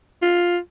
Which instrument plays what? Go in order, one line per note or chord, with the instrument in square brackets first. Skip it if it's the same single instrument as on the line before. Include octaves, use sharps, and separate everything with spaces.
[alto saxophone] F4